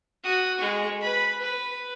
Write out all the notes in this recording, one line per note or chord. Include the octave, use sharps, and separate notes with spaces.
F#4 D#6
G#3 C#6
B4 B5
B4